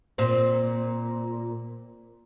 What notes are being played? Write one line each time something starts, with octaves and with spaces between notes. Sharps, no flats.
A#2 C4